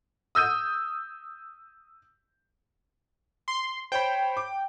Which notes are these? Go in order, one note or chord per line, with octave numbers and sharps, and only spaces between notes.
D#6 E6 G6 D#7
C6
C5 C#5 G5 B5
D6